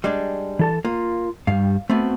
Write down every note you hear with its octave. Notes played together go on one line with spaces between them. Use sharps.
G3 G#3 D4
E3 A4 A5
A#3 F4
G2 G3 F5
A3 B3 C4 F#4